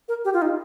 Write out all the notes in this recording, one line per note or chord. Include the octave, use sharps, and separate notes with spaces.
A#4
G4
F4
D#4